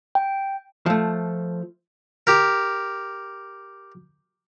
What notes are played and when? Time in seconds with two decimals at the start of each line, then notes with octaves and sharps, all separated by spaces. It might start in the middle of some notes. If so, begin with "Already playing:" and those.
0.15 G5
0.86 F3 A3
2.27 G4 A#4